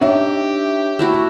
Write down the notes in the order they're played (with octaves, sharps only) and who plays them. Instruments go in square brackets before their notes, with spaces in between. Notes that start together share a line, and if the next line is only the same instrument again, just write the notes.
[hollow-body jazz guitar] D4 D#4 [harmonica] G4 [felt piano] C#5 E5
[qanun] A3 E4 F#4